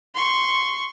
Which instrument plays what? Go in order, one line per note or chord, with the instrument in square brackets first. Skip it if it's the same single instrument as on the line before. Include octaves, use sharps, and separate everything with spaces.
[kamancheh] C6 C#6